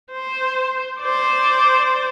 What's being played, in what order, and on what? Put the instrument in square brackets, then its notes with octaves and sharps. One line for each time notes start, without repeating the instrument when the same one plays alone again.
[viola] C5
C5 D5